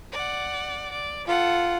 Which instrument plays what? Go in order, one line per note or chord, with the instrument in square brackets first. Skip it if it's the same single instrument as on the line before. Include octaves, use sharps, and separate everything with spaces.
[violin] D5 F#5
D5
[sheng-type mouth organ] F4 [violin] A4 F#5